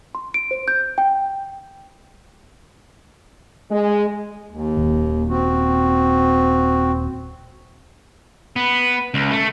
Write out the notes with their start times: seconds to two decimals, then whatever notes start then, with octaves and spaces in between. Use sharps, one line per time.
0.15 C6
0.34 D7
0.51 C5
0.68 G6
0.98 G5
3.70 G#3
4.50 D#2
4.77 D#1
5.29 C4 F#4
8.56 B3
9.14 C#2
9.31 A3